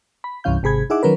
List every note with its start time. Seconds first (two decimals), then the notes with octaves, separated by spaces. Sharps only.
0.24 B5
0.44 C2 G2 E3 C#4 F5 G6
0.63 G#1 C3 G#4 B5 G#6
0.90 D#4 E4 G#4 E5 F#5 D6
1.03 D#3 F#3 C#4 A#4 B4